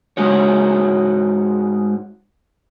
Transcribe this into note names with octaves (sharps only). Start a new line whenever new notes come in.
G#2 G#3 D#4 F#4 C#5